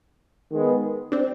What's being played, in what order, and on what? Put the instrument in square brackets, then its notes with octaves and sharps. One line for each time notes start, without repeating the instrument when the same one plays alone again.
[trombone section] D#3 G#3 B3
[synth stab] C4 D4